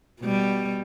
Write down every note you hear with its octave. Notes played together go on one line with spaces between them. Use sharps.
B2 G3